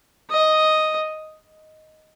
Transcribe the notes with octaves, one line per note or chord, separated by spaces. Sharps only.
D#5